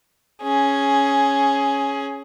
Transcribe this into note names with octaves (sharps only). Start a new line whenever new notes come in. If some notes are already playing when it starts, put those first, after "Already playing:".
C#4 G#4